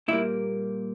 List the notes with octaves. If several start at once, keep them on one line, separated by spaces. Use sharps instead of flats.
A#2 G3 A#3 E4